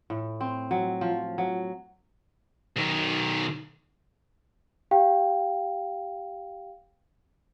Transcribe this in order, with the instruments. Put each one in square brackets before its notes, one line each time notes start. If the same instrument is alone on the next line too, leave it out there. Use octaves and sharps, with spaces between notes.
[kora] A2
C4
F#3
F3
F#3
[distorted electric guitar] B1 D#3
[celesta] G4 F5 G5